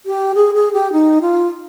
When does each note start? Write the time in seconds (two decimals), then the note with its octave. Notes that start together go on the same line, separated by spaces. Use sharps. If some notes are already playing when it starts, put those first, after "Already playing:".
0.06 G4
0.35 G#4
0.54 G#4
0.73 G4
0.92 D#4
1.22 F4